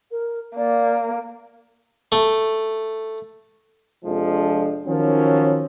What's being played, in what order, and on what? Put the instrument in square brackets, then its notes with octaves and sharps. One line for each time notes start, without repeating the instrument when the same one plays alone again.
[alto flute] A#4
[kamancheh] A#3 [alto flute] D5
[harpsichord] A3
[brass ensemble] F2 C3 F3 G#3 D4
D#3 F3 F#3 C#4